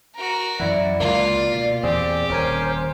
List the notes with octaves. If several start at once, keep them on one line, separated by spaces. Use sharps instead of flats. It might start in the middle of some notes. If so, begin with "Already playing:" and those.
F#4 A#4
F#2 E3 E4 D5 F#5
C#2 A#3 F4 D5
B2
E2 A#2 C4 G4 G#4
D#1 C#4 A#4 C5 G#5